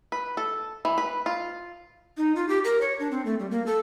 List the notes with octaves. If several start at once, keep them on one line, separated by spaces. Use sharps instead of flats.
B4
A4
E3
B4
F4
D#4
F4
G4
A#4
C#5
D4
C4
A3
G3
A#3
A4